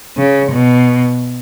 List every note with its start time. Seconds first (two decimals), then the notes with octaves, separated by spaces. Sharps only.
0.17 C#3
0.52 B2